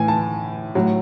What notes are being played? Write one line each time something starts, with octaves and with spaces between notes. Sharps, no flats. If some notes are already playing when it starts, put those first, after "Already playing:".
Already playing: A2 E3 G#5
A5
A2 F#3